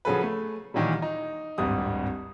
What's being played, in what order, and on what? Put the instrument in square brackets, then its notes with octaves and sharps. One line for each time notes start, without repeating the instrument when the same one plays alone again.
[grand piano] C#3 F3 F#3 G#4 A4 B4
A3
A#2 D#3 E3 F#3 G3
D#4
D1 G#1 G2 G3 D#6